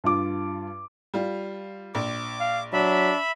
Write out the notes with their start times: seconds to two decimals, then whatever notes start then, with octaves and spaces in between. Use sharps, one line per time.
0.04 G2 F4 D6
1.14 G3 F4
1.95 A#1 D6
2.40 F5
2.73 F#3 D4 E5 B5